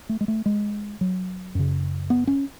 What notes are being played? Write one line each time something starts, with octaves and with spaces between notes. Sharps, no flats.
A3
G#3
A3
G#3
F#3
F#2 C#3
B3
C#4